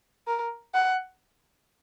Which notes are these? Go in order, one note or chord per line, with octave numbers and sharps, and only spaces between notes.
A#4
F#5